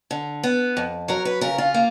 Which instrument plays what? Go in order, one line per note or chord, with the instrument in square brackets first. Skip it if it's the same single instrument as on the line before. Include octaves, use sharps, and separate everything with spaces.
[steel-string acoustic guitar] D3
B3
F2
F#3 A#4
B4
C#3 A#4
F4
A#3